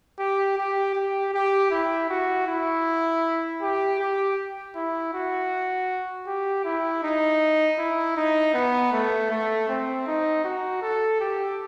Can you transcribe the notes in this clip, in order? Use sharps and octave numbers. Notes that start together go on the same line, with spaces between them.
G4
G4
G4
G4
E4
F#4
E4
G4
G4
E4
F#4
G4
E4
D#4
E4
D#4
B3
A3
A3
C4
D#4
F#4
A4
G4